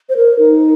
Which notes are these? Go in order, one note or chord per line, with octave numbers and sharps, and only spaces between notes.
C5
A#4
D#4